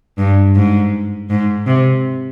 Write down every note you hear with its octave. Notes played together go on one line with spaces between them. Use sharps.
G2
G#2
G#2
C3